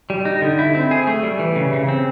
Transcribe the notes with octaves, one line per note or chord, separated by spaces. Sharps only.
G3
D#4
D3
E4
C4
G#4
A3
G3
E3
C#3
C#3
C4